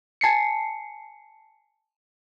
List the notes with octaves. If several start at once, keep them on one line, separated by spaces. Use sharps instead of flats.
G#5 A5 C7 C#7